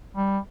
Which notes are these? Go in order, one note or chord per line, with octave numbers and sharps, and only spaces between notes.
G3